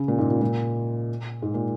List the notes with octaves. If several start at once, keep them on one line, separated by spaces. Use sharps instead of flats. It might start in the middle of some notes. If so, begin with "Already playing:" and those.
Already playing: C#3
A#2
G#2
A#2
A#2
G#2
A#2